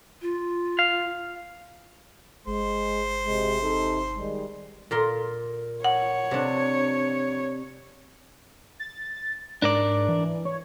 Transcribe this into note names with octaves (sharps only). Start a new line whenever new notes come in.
F4
F5
G1 G#3 C5
C3 G#3
C3 D#4 A4
D#3 G3 G#3
A#2 A#4 C6
C#5 F#5
C3 D4
A6
G#2 D4 A#4 D5
E3
C#5